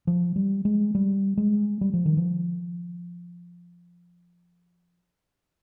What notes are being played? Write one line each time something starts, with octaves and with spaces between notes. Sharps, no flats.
F3
G3
G#3
G3
G#3
G3
F3
D#3
F3